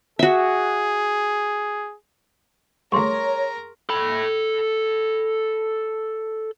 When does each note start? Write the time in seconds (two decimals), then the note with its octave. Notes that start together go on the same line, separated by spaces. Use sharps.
0.19 F#4 G#4 E5
2.92 D2 G2 G#4 A#4 C#5 A#5 C6 C#6
3.89 A4 B5